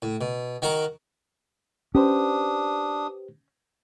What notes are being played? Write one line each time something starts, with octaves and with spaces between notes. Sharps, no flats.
A2
B2
D#3 F#4 A#4 F#5 A#5
C#4 D4 G4 B4 C5 D#6